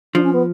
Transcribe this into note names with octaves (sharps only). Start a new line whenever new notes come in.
F3 D4
C#4
B3